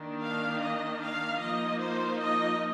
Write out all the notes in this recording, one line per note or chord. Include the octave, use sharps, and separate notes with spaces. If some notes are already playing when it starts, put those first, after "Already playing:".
Already playing: D#3 A#3 D4
F5
D#5
F5
F3 A#3 D#4 D#5
C5
D#5